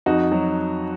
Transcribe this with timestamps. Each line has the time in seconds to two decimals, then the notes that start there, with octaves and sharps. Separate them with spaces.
0.06 F2 D#4 F#4
0.32 F#3